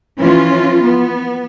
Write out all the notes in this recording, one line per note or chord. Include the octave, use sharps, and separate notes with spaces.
E3 F3 C#4 F4
B3